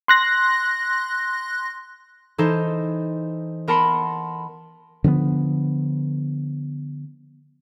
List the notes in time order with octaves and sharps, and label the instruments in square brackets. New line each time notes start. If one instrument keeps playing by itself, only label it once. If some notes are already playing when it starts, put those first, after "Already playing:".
[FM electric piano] C6 F#6 A#6
[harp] E3 D#4 A4 C5
B3 A#4 A5 B5 C6 C#7
[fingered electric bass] D3 F3 A#3 B3